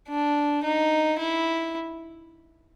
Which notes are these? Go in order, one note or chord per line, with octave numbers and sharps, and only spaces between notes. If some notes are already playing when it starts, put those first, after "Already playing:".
D4
D#4
E4